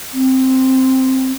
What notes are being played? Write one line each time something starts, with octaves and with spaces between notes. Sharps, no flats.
C4